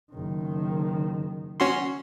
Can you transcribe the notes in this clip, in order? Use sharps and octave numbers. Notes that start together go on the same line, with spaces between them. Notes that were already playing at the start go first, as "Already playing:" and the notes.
F#1 D#3
C#4 F#4 C6